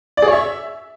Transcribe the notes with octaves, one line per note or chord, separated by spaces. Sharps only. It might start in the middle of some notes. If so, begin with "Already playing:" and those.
D5
G#4
C#5
E5